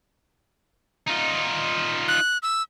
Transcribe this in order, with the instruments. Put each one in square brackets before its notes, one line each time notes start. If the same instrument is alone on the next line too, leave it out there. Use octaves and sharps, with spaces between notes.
[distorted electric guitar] D#4 F4
[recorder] F#6
E6